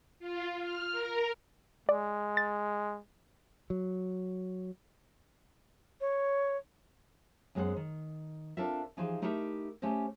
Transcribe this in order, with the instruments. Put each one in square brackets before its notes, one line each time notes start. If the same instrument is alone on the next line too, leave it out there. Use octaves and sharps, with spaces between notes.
[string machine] F4
F6
A#4
[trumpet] G#3 [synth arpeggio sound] D5
[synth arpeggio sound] A6
[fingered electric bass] F#3
[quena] C#5
[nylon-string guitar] F#2 G#3 B3 G#4 C5 F#5
D#3
C4 D4 F4 A4 A#4 E5
E3 F3 D#4 G4 G#4 C5
A3 D#4 E4 G4 A#4 E5
A3 C#4 G4 C5 D#5